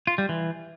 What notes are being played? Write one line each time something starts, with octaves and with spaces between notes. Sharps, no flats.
F4
G3
E3